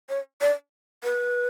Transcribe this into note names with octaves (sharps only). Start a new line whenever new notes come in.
C#5
D5
B4